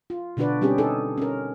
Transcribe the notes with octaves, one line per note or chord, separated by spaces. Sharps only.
F4
B2 D3 D4 F#4 B4 D5
G3 C4 C#4 G4 G#4
D#4 G#4 A4
C#4 A#4